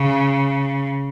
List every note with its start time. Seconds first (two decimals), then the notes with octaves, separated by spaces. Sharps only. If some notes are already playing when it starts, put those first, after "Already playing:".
Already playing: C#3